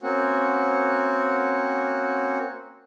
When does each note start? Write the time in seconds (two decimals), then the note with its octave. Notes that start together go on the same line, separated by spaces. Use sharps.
0.01 A#3 C4 C#4 F#4